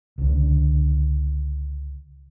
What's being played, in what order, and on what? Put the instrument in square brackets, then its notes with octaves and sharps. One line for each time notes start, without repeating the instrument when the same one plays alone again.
[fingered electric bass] C#2 D3